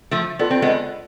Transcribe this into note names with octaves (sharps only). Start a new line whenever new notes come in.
F3 A3
B3 F4 A4 D5
C4
G#3 B3